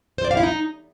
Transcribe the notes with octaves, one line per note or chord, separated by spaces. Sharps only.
C5
D5
F5
E4
D#4